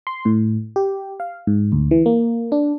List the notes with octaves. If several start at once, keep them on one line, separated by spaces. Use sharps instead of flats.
C6
A2
G4
F5
G#2
D2
E3
A#3
D4